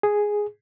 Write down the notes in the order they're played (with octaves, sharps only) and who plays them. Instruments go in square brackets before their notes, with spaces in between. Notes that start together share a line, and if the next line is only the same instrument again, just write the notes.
[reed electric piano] G#4